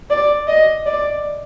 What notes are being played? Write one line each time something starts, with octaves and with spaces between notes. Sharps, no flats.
D5
D#5
D5